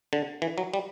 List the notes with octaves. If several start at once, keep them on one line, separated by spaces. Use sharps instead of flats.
D3
E3
F#3
G3